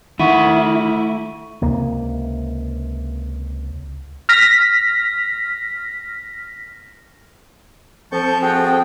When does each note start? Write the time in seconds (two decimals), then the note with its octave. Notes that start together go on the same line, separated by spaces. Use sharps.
0.20 D#3 A3 E4 F#5 C#6 D#7
1.62 C#2 C3 A#3
4.29 F6 A#6 B6
8.12 F3 C4 A4 A5 C#6 G6
8.42 F#4 G#4 G5